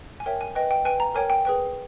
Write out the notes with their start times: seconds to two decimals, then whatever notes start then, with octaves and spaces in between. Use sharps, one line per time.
0.20 G#5
0.26 A#4 C#5 E5 G5
0.41 G#5
0.55 B4 D#5 G5
0.71 G5
0.85 B4 G5 G#5
1.00 A#5
1.15 A#4 C#5 G5 G#5
1.30 G5
1.45 G#4 B4 G5